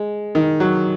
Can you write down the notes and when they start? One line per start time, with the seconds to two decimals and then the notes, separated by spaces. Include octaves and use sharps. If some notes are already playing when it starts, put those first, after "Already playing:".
Already playing: G#3
0.35 D#3
0.60 F#3